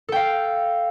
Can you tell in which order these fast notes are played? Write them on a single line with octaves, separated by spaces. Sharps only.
A4 G5 F5